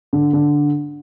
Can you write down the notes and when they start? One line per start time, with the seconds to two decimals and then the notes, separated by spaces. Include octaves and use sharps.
0.13 D3
0.33 D3